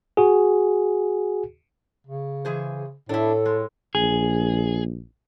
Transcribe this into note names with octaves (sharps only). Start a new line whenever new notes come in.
F#4 G#4
C#3
E3 G#4 C5
A2 D4 E4 A4
G#3
A#1 G#4